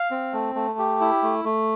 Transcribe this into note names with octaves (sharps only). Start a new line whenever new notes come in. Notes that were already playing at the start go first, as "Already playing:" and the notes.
Already playing: F5
C4
A3
A3
G4
E4
A3
A3